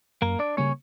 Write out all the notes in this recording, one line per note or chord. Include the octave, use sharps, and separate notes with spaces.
F#2 A#3 A#4
D4 D5
C#3 G3 A#3 C#4 C#5